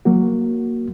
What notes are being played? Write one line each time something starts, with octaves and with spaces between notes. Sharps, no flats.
F#3 A#3 F#4